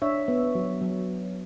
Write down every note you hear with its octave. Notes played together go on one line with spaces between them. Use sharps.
D4 C#5 E5
B3
F#3
F#3